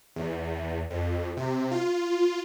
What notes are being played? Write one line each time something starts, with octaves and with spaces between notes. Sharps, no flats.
E2
F2
C3
F4